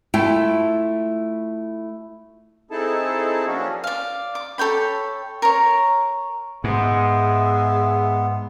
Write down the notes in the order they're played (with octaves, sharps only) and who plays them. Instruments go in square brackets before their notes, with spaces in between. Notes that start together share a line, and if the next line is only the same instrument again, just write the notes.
[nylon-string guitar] A3 E4 F4 G5
[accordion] C4 D#4 E4 G#4 A4 A5
F3 F#3 A#3 C#4 D4 F#4
[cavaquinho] D5 F5
D6
A4 C#5 G5 B5
A#4 C#5
[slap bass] G#2 [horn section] G#3 E5 [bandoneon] B3